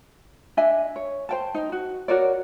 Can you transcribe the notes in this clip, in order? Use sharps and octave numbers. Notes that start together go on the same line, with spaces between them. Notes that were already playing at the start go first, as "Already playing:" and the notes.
D4 D#5 E5 G#5
C#5
C5 G5 A5
D#4
F#4
F#4 A#4 C#5 D5